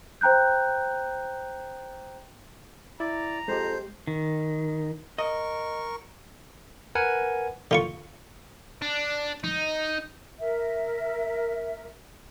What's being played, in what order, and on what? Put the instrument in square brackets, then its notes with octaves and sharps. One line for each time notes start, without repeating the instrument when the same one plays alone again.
[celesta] C5 G5 A#5 F#6 G6
[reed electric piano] E4 [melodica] D5 [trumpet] A#5
[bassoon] F2 [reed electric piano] G#3 G4 [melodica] C5
[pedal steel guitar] D#3
[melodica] A#4 C#6 [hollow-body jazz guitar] D#5
[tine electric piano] A#4 B4 F#5 G#5
[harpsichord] D3 F4 C#6
[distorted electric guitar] D4
D#4
[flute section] A#4 E5